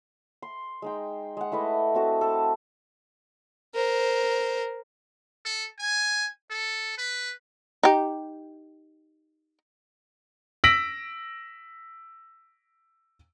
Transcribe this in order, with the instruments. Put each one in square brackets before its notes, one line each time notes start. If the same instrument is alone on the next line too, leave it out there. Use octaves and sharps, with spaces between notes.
[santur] C6
G#3 D#4 G5
G#3 F#5
A3 E4 B4 D#5
C4 F#4 A4
A4 A5
[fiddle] A#4 C5
[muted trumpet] A4
G#5
A4
B4
[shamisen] D#4 G4
[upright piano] E6 A#6 B6 D7 F#7